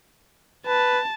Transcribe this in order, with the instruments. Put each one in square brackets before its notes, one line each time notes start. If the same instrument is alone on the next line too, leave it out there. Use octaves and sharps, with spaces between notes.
[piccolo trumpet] B4 [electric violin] A5